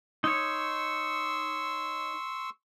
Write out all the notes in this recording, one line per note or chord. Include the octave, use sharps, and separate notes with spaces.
D#4 C#5 C6 C#6 E6